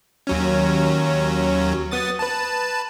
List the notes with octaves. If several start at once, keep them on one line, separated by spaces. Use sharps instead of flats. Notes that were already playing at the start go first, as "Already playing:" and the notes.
D#2 F#3 C#4
B3 D#6 A6
B4 A5